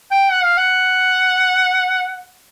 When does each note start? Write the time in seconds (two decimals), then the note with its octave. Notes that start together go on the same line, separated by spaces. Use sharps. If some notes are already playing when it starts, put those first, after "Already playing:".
0.11 G5
0.31 F#5
0.44 F5
0.57 F#5